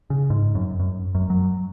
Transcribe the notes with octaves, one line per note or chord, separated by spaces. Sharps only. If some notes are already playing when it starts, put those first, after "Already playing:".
C#3
G#2
F#2
F#2
F#2
F#3